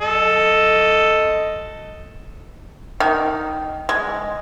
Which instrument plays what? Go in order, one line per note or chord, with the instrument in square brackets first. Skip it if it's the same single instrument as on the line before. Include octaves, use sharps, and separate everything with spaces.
[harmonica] A4 D#5
[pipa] D#3
G#3